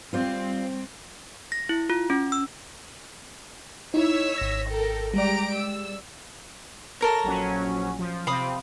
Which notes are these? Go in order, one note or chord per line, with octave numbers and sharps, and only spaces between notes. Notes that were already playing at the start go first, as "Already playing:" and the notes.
G3 C4 F4 C5 D5
A#6
E4
F4
C#4
E6
D#4 E4 C#5 E6 B6
G#1 A#6
A4 A#4 G5
G3 G#3 G4 D5 A#5 D7
E6
A4 A#4 C#5 A#6
A#1 F#3 C#4
F3
C3 C4 F5 B5 D#6